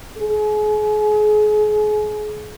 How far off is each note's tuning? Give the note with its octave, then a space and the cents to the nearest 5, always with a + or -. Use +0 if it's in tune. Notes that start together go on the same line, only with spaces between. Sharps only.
G#4 +35